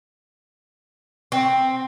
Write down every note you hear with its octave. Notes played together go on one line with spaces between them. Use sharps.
C4